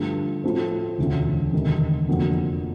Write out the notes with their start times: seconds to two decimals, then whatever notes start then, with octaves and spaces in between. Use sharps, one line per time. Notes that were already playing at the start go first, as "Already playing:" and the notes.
Already playing: G2 D3 F3 A3
0.44 A2 F3 A3 C4 E4
0.98 E1 D2 C#3
1.52 E1 D2 C3 D#3
2.08 F1 F2 D3 F#3 A#3